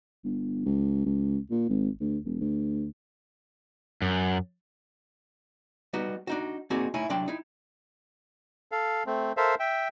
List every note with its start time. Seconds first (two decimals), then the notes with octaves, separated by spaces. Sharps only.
0.24 G1
0.65 C#2
1.05 C#2
1.51 A#2
1.69 G#1
2.01 D2
2.25 E1
2.41 D2
4.02 F#2
5.93 G3 B3 D#4 F#4
6.27 D4 D#4 F#4
6.70 A#3 C4 D#4 F#4 G#4 D5
6.94 A3 D#4 E4 C#5 G#5
7.10 C2 F#3 D4 D5 G5 C6
7.28 D#4 E4
8.72 A4 F5
9.06 A3 C4
9.37 A4 A#4 C5 E5 F5
9.60 E5 G5